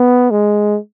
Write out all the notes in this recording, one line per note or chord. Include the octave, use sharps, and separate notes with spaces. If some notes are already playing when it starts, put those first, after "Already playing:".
Already playing: B3
G#3